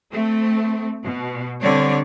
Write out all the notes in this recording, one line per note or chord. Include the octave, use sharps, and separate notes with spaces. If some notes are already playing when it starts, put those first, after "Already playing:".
A3 C4
B2
D3 G3 C4 C#5 D5